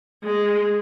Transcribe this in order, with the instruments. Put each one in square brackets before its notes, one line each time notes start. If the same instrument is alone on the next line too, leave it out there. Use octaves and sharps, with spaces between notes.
[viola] G#3